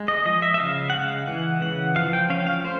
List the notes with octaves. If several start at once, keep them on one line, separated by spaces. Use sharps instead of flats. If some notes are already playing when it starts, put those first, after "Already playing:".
Already playing: G#3
D#5
F3 D#5
E5
E5
C#3 F5
F#5
G#3 F5
E3 F#5
C#3 F#5
F3 F5
G5
C#4 F5
F5
A3 C5